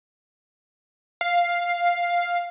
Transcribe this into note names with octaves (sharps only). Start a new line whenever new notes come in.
F5